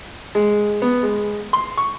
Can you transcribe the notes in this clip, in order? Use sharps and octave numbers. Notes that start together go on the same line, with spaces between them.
G#3
B3
G#3
C6
C#6